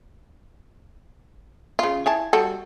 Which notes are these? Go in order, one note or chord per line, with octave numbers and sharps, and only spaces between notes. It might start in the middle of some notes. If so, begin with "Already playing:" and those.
C#3 F4
E4 G#5 A5
G3 F#4 A4